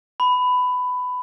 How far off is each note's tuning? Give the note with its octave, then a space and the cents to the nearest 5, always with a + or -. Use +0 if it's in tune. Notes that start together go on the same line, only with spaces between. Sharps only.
B5 +15